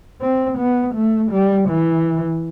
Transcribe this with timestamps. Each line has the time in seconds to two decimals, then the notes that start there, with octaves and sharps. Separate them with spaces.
0.22 C4
0.58 B3
0.95 A3
1.32 G3
1.69 E3